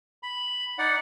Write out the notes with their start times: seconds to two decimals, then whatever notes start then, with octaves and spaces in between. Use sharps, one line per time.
0.23 B5
0.78 D#4 D5 F#5